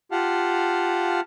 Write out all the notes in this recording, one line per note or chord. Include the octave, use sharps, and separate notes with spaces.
F4 G4 F5 F#5 A5 F6